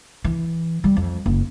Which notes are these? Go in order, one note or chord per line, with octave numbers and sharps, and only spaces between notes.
E3
G3
F2
F#1